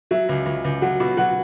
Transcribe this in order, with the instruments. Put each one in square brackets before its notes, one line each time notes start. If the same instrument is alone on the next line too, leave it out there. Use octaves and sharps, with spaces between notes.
[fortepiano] F#3 [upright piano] E5
[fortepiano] C#2
C#2
C#2
[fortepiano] F#3 [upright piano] F#5
[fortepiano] B2
[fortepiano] F#3 [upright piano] F#5